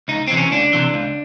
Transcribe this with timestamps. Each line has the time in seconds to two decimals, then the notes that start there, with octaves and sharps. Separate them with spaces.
0.08 C#2 D#4
0.27 C3 E3 C4
0.37 C#4
0.51 C#2 D4
0.73 C3 E3
0.94 C#2